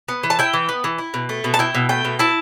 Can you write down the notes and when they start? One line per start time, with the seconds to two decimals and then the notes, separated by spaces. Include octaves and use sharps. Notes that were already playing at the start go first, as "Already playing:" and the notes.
0.08 B3
0.23 E3
0.30 A5
0.39 E4 G5
0.53 E3
0.69 B3
0.84 E3
0.98 E4
1.14 B2
1.29 A3
1.44 B2
1.54 A5
1.59 E4 G5
1.75 B2
1.89 A3 G5
2.05 B2
2.19 E4 A5